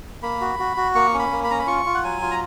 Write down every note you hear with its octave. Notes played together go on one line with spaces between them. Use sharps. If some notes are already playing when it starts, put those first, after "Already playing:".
A#3 B5
F#4
F#4
F#4
A#3 C#6
C#4
B5
A#3
B5
C#4 A#5
B5
F4 C#6
F4
F#5
F#3 G#5
F4
A#5